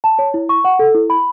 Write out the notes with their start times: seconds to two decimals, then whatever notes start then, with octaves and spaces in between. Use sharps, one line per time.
0.04 A5
0.19 C#5
0.34 E4
0.49 C#6
0.65 F#5
0.79 A4
0.95 E4
1.10 B5